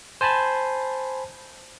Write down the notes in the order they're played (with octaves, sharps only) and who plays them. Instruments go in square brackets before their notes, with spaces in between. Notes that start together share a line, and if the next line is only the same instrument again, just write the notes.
[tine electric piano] C5 G#5 A5 B5